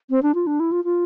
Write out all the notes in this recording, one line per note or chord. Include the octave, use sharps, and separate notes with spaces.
C4
D4
F4
D4
E4
F4
F4